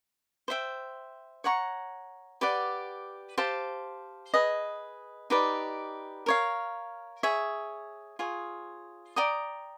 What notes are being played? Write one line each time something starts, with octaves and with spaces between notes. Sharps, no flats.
C5 E5 G5
C#5 F#5 A#5 C#6
G4 B4 D5 F#5
G4 C5 F5 A5
G#4 B4 D#5
D#4 G4 B4 D5
A#4 C#5 F5
G#4 C#5 E5
F4 G#4 C#5
D5 G5 A#5 D#6